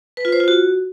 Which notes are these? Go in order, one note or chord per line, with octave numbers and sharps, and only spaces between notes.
B4
F4
C5
F4
F#4